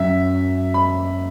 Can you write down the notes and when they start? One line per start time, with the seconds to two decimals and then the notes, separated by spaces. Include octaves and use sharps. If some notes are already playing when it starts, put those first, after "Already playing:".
Already playing: F#2 F#3 C#4 E5
0.74 B5